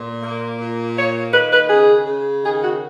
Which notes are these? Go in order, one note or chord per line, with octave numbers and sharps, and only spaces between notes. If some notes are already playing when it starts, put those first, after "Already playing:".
Already playing: A#2
A#3
A#2
A#3 C#5
D#3 B4
B4
C#3 G#4
C#3
D#3 G#4
F#4